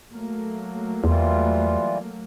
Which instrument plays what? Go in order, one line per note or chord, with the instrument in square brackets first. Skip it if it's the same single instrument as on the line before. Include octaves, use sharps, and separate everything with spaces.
[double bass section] F#3 A3 A#3
[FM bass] E2 [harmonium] E3 G3 F4